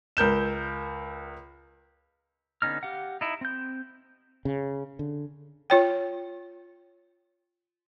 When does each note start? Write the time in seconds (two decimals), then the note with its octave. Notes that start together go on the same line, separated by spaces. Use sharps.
0.17 C#2 A#4 G6 E7
2.62 D3 B3 C#4 D#4 F6
2.83 G4 F5 F#5
3.21 D#4 E4
3.41 C4 G6
4.45 C#3
4.99 D3
5.70 F4 C#5 G5